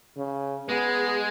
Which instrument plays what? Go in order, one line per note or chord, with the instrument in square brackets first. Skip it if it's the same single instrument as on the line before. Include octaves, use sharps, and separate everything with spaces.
[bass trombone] C#3
[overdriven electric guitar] G#3 [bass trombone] B3 [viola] G#4